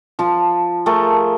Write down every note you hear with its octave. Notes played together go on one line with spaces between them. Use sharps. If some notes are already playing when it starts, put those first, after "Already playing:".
F3 A5
A3 G#4 A#4 A5